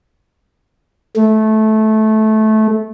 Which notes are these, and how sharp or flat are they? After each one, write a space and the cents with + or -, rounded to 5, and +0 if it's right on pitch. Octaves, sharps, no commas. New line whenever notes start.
A3 -15